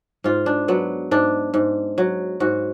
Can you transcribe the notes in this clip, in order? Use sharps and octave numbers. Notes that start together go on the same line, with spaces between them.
G#2 F4
D4
F#3 B3
G#2 D4
G#2
F#3
G#2 F#4